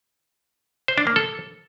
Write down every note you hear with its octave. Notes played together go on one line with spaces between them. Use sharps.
C5
D4
A#3
A4